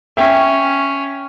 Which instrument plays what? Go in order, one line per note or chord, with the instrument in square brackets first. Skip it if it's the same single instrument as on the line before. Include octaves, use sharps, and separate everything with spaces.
[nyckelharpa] C#4 [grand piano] E5 G5